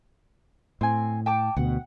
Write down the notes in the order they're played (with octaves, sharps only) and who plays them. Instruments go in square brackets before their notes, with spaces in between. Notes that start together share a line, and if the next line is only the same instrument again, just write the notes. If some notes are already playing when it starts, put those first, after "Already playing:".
[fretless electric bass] A2 [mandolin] C4 G#5
[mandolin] G5 A5 D6
[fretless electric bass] D2 B2 [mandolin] F#5